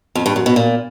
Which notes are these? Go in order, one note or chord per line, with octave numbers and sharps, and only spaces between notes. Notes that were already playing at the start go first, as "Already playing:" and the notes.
F2
G2
F#2
B2
A#2